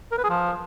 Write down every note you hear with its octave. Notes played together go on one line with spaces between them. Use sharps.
A#4
B4
G#4
F3